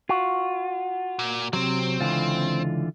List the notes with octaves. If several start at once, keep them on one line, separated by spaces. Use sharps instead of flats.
F4 F#4
A#2
C3 F#3 C4
C#2 D3 E3 F4